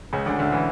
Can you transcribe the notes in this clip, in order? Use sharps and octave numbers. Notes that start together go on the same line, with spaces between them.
C#2 C#3
D2 D3
D2 D3
E3